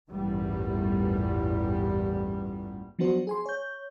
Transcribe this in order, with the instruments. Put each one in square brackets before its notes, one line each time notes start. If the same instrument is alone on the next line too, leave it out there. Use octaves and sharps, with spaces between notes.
[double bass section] A1 E2 G2 A#2 G3
[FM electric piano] F3 F#3 B3 D4 F#4 C5
G#4 G#5 C6
C#5 G6